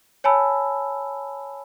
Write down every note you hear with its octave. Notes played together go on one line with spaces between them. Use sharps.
C#5 G#5 A5 B5 E6